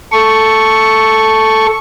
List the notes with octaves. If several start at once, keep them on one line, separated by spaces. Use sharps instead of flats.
A4 C#6